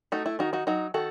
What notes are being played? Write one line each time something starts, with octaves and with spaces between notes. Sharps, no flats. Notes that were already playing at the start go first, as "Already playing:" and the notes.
A3 D#4 F#4
E4
D#3 D#4 F#4
D#4 F#4
F#3 D#4 F#4
D#3 F#4 A4